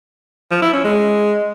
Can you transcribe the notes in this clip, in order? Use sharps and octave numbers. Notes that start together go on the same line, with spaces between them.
F3
E4
C#4
G#3